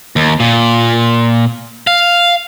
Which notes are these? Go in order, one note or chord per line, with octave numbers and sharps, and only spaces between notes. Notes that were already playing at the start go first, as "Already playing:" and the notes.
D#2
A#2
F5